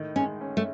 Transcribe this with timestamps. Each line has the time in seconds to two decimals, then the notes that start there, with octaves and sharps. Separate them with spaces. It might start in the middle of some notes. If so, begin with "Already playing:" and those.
Already playing: A2 D#3
0.16 G#3 C#4
0.41 C#4
0.57 A3